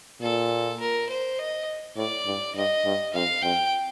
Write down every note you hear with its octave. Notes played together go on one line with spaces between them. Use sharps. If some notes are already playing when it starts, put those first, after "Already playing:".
A#2 A4
A#4
C5
D#5
A2 D5
G2
G2 D#5
G2
F2 F5
F2 G5